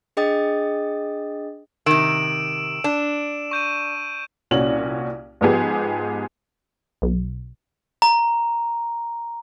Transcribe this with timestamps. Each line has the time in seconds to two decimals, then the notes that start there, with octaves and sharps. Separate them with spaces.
0.17 D4 G#4 D#5 G5 D#6 A6
1.86 C3 D#3 E6 D7 E7
2.84 D4 E7
3.51 C#6 G6 D#7
4.51 C2 A#2 C#4 F#4 F#7
5.41 G#2 F3 B3 G4 G#4
7.02 B1
8.02 A#5